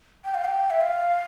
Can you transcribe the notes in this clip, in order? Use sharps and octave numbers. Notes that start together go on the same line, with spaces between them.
G5
F5
G5
E5
F5